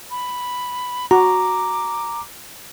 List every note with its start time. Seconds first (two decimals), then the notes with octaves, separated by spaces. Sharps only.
0.11 B5
1.11 F#4 A#5 D6